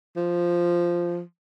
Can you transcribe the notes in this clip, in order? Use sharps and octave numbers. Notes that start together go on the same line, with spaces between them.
F3